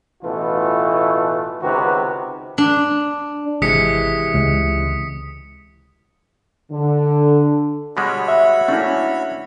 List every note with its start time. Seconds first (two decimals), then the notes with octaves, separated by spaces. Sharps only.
0.23 A1 B2 E3 A3 F4 B4
1.62 C#2 C3 D#3 F#4 B4
2.58 D4
3.62 G#1 C3 E3 G#3 D#6 B6 C#7
4.34 C#2
6.71 D3
7.97 B2 G3 G#3 F#4 C#5 B5
8.28 E5
8.68 A3 A#3 C#4 D4 E4